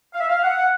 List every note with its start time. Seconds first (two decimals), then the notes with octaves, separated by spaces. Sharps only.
0.14 F5
0.21 E5
0.29 F5
0.43 F#5